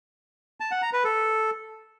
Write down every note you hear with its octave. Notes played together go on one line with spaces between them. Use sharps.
A5
F#5
A#5
B4
A4